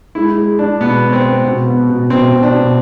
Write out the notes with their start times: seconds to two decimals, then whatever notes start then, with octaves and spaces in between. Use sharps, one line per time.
0.15 G#3 E4
0.37 G#3
0.59 G#3 D4
0.80 B2 B3
1.02 B3
1.13 C4
1.24 B3
1.45 B2
1.67 B3
1.89 B2
2.10 B2 C4
2.33 B2
2.43 D4
2.54 B2